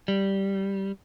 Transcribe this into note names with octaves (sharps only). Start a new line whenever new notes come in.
G3